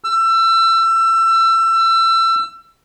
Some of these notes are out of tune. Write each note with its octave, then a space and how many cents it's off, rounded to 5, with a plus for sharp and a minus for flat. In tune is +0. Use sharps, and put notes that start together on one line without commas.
E6 +25